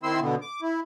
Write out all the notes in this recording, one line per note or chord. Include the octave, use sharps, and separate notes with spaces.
D#3 C4 E4 C6 E6
B2 D3 B3
D6
E4